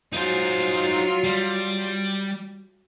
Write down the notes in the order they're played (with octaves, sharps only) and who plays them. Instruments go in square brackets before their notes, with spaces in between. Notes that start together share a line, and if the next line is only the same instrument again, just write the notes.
[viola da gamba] F#3 F4 [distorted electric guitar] D#4 C5
[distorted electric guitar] G3